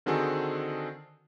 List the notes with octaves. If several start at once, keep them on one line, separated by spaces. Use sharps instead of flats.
D3 D#3 C4 F#4 G#4 A4